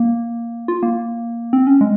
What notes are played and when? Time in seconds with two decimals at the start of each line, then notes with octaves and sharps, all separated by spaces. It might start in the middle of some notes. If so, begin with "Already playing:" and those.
Already playing: A#3
0.68 F4
0.83 A#3
1.53 C4
1.67 C#4
1.81 G#3